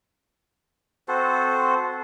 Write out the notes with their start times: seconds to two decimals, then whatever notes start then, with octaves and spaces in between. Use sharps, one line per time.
1.08 C4 F#4 A4 C5